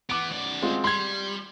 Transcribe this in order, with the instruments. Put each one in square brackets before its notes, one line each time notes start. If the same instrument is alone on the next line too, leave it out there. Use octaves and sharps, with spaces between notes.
[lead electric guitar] E3 B3 [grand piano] D6 D7
[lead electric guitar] F#2 D5
[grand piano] G#3 C4 F4
[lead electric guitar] G3 [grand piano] C6 G#6